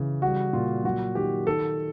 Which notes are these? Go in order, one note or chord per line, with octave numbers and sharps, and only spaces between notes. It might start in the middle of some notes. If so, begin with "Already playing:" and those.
Already playing: C#3 E3
G3 F#4
A#2 F4
F#3 F#4
D#3 G4
D#3 A4